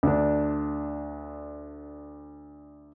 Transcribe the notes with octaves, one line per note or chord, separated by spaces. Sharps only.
D2 D4